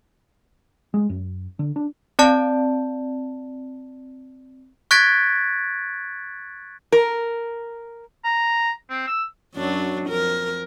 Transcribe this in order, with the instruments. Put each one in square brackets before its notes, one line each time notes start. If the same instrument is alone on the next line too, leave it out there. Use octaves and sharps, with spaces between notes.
[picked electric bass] G#3
F#2
D3
D4
[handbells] C4 D5 A5
[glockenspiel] C#6 F#6 G#6 A6 B6 D7
[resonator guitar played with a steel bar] A#4
[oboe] A#5
C4
E6
[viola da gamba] F#2 F#3 D4
F2 A#4